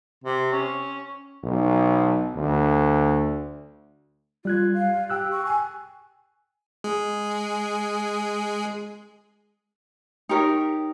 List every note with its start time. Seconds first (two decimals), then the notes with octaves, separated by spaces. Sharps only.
0.24 C3
0.52 C#4
1.44 B1
2.35 D2
4.45 G3 F4 F#6 G#6
4.74 F5
5.10 G4 G5 E6 F#6
5.31 C#6
5.45 G#5
6.84 G#3 G#4
10.29 D#4 G4 A#4 C#5